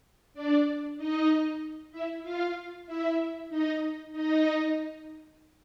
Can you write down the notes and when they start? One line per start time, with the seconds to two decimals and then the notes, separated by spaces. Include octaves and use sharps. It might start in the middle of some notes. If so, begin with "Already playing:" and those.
0.34 D4 D5
0.98 D#4 D#5
1.92 E4 E5
2.23 F4 F5
2.86 E4 E5
3.49 D#4 D#5
4.13 D#4 D#5